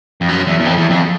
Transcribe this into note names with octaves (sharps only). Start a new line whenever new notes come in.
F2
F#2
E2
E2
F2
E2
F2